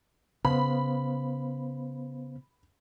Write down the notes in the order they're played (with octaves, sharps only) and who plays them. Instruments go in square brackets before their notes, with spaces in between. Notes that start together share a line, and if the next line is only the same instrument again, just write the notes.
[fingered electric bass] C#3 [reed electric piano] B3 C5 F5 [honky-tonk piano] B5